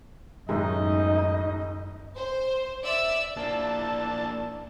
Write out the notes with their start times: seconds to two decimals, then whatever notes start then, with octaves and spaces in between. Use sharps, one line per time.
0.49 F#2 A2 D#3 G#3 D#4 D#5
2.17 C5
2.83 D5 E5 E6
3.37 A#3 D4 E4 D5 A5 E6